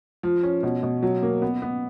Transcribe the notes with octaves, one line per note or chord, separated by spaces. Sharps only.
F3
C#4
B2
B2
F#3
A#3
B3
B3